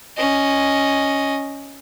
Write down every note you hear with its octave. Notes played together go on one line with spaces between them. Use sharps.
C#4 D#5